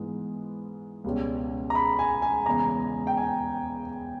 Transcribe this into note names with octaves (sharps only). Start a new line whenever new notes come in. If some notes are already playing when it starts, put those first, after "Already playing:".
Already playing: G#2 E3 G#3 B3
C#2 B2 G3 C#4
A#5
B5
G#5
G#5
E2 C#3 G#3 A#5
G5
G#5